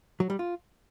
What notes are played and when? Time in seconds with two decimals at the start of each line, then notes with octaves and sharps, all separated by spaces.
0.20 F#3
0.30 G3
0.39 F4